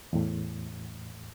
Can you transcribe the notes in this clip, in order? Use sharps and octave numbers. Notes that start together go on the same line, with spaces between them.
E2 A2